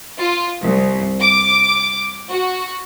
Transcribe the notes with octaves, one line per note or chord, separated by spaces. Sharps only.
F4
C2
D6
F#4